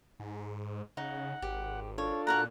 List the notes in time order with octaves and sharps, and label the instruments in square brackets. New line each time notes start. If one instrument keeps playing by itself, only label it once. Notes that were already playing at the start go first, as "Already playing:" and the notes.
[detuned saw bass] G#2
[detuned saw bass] C#3 [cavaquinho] D#4 [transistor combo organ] F#5
[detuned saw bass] G#1 [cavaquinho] G4
[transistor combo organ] D4 F4 A4 [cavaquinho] C#5
[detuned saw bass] A#2 [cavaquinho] F#4 A#4 A#5 [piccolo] F#6